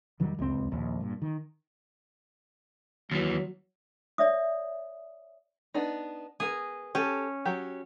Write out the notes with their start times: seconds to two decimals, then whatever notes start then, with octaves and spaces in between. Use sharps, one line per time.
0.20 F1 D#3 F#3 G3
0.39 D1 C#2 F#2 C4
0.71 D#1 A#1 D#2
1.00 G2 A#2
1.22 D#3
3.11 D#2 E3 F#3
4.18 C#5 D5 E5 D#6
5.74 B3 D4 D#4
6.40 B3 G#4 A#4
6.95 C#4 G4 A4
7.45 F#3 G4